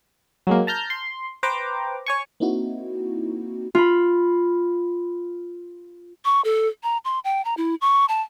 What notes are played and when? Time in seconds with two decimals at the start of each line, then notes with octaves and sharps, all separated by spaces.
0.47 F#3 G#3 A#3
0.67 A5 A#5 F6 G6
0.90 C6
1.43 B4 C5 G5 A#5 D6
2.06 C#5 G#5 C#6
2.40 A#3 C4 D#4 E4 F#4
3.75 F4 B5
6.25 C#6
6.44 A4
6.83 A#5
7.05 C6
7.24 G5
7.45 A#5
7.57 E4
7.81 C#6
8.09 A5